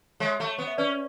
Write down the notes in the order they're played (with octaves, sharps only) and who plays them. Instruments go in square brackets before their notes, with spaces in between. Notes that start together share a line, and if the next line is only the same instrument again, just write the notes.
[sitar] G#3 [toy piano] C#5 E5
[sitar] A3
B3
[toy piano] E5
[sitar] C#4 [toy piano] B4 D5